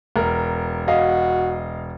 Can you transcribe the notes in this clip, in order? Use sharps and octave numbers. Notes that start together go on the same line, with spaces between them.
E1 A#4
F#4 D#5 F5